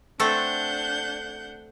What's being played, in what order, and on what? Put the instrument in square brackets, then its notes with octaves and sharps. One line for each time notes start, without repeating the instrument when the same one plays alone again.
[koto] A3 C4 A4 [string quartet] D4 F#5 G6